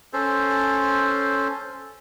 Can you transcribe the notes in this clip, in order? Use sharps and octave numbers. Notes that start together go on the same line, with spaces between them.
C#4 A4 C5